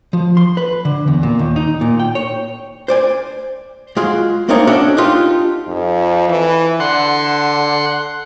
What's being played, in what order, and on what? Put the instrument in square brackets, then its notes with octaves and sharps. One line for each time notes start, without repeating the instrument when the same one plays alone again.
[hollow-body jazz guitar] F3
C6
B4
D3
E2
A#2
D#2
D#4
A#2
G5
C#5
C5 D5 G#5
G#3 F4 F#4 G#4
A3 A#3 C4 D4 D#4 C#5
C#4 D4 F#4 A4 D#5 E5
D4 D#4 F4 G4
[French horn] F2
E3
[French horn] D3 [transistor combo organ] F#5 C6